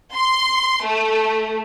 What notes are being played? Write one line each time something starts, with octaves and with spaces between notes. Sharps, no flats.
C6
A3